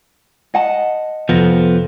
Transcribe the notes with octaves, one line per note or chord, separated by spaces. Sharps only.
D#5 F#5 A5
F2 C3 F3 B3 A#6